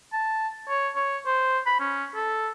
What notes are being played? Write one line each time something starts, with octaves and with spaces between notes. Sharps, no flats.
A5
C#5
C#5
C5
B5
C#4
A4